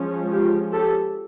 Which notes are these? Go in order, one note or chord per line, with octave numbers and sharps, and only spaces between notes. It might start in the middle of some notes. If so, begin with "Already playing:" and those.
Already playing: F3 G#3 C#4
F4 G4
G4 A4